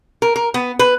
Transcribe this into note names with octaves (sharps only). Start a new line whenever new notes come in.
A#4
A#4
B3
B4